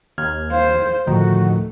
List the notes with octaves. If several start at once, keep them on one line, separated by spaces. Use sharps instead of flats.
D#2 F6 G#6
C5 F5
D2 A2 D#3 F3 A3 F#4